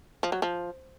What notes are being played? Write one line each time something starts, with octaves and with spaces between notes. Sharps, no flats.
F3
F#3
F3